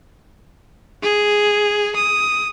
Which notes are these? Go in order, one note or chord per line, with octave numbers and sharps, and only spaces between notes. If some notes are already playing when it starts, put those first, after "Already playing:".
G#4
D#6